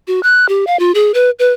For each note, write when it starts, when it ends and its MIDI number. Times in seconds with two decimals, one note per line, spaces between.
0.08 0.22 66
0.23 0.48 90
0.49 0.65 67
0.67 0.79 77
0.79 0.92 65
0.95 1.12 68
1.14 1.30 71
1.39 1.53 71